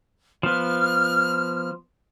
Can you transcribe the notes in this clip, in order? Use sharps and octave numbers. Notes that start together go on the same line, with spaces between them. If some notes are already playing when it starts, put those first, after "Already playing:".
F3 B3 F6